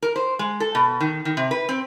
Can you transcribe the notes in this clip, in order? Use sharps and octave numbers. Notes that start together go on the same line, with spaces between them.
A#4
C5
G#3
A4
B2
D#3
D#3
C3
B4
C4